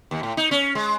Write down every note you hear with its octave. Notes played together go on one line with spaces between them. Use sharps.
D#2
A2
D#4
C#4
G#3